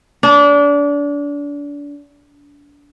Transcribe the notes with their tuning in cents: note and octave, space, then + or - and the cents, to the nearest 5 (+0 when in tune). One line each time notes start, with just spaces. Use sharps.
D4 -30